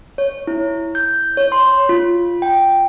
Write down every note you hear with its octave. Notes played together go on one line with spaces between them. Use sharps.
C#5
E4
G6
C#5
C6
F4
G5